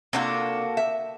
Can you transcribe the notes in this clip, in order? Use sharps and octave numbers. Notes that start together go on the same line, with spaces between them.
C3 A#3 D4 F4 F#4 A4
E5